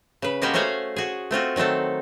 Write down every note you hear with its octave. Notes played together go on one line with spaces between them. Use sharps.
C#3 B4
G#3 A#3 B3 C#4 F#4 G4
A3 C#4 F#4 C5 C#5 F5
F#4 G#4
A3 C4 F4 F#4
D#3 F#3 A3 C4 A4